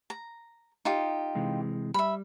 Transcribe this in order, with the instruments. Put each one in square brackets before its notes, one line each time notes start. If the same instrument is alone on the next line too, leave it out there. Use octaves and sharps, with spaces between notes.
[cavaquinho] A#5
D#4 F4 G4
[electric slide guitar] C3 E3 G#3
[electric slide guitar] G3 [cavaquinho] E5 B5